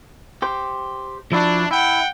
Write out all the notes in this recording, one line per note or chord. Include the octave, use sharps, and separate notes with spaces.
G4 C5
F3 D4 E4 F#4
E4 F#5 G5